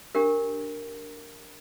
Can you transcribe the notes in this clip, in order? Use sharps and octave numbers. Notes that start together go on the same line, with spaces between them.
D4 G4 A#4